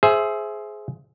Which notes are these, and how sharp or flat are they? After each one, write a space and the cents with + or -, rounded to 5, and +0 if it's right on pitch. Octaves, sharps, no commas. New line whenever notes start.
G#4 +15 C5 +0 E5 +10